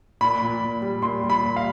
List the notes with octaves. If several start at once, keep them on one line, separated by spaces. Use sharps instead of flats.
A#2 B5
A#2
A#2
G3
A#2 C6
G3
B5
A#2
F5